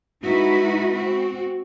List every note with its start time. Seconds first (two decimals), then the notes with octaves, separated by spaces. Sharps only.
0.22 G#3 D#4 E4 F#4 B4
0.92 C4 F#4